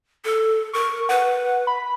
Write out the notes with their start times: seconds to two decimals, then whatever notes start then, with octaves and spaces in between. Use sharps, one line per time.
0.24 A4
0.73 A#4 C#6
1.09 B4 F#5
1.67 B5